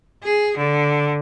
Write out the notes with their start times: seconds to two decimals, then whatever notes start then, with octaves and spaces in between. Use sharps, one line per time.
0.23 G#4
0.57 D3